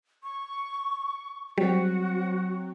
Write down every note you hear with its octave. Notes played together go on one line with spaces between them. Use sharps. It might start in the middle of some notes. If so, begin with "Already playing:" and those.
C#6
F#3 G3 C4 F#4